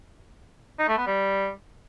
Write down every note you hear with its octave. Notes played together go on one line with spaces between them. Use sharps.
D#4
A3
B3
G3